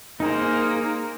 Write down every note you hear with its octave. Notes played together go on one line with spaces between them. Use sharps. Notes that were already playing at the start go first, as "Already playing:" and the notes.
A#3 D#4 G#4 C5